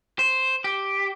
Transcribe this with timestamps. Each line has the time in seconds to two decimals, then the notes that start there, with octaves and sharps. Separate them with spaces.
0.19 C5
0.64 G4